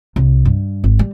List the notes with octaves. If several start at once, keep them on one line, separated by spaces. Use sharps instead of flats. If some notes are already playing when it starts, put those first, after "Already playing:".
C2
G2
G#1
G3